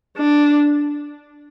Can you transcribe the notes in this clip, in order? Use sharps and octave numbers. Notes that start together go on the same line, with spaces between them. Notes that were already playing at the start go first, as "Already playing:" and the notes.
D4